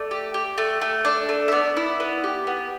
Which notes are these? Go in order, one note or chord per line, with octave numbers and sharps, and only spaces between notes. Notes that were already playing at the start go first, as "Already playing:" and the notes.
Already playing: A3 D5
G4
G4
A3
A3
D4
A3
E5
B3 D5
E4
B3
G4
B3